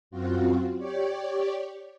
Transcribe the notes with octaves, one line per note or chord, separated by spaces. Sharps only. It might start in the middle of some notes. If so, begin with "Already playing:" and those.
F#2 C4 F4 F#4
G4 C#5 D5